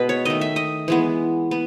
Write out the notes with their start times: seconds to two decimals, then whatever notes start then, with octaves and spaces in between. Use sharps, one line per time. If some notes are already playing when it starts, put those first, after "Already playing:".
Already playing: B2 G#3 B3 B4 D#5
0.09 C#5
0.25 D#3 A3 D#5
0.41 E5
0.56 D#5
0.88 E3 G#3 B3
1.51 B3